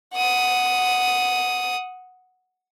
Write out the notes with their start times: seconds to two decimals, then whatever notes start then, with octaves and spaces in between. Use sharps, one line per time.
0.15 F#5 D#6